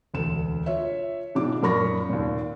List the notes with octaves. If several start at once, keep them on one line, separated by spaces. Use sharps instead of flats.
E1 D2 E7
F4 C#5 E5
G#2 B2 D#3 D4 F4 D6
F#2 A#2 A#4 B5 C#6 A#6
D#2 A#2